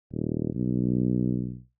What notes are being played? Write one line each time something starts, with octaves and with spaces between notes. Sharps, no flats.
D#1
B1